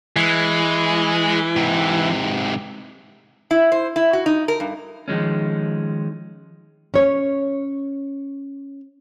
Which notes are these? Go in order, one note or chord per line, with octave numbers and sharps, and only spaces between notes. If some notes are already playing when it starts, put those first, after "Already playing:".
E3 G#3
G#2 C3
E4
C5
E4
F#4
D#4
A#4
G2
D#3 F3 G#3 C#4
C#4 C#5